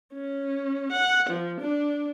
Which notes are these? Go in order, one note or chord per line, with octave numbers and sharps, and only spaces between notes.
C#4
F#5
F3
D4